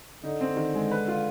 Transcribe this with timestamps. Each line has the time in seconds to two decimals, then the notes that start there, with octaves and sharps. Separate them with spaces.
0.23 D3 D#4
0.41 C4
0.57 D#3
0.75 G#3
0.91 B4
1.08 F4